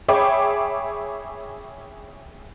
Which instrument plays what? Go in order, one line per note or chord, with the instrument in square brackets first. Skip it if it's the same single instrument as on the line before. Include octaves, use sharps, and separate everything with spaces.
[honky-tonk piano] G#4 C#5 E5 G5 B5 D6